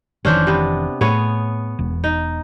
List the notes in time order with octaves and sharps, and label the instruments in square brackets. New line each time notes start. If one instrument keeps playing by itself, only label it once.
[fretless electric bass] F1 D#3 E3 [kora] C#4 D4 C5
[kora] C3 B3
[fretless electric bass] A2 [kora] B3 G#4 C#5
[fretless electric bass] E1
[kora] D#4